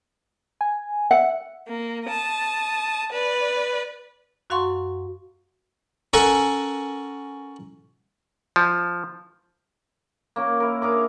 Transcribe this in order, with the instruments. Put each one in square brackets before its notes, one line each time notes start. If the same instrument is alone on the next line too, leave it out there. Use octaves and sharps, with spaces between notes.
[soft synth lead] G#5
[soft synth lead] E5 [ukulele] F#5
[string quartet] A#3
A5 D#6
B4 D5
[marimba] F#2 F#4 F5 F#5 C6 C#6
[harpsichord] C#4 A4 A#4 F#5 G#5
[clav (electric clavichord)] F3
[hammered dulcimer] A#3 C#4 A#4
E4 A#4
D4 G#4 A#4 D6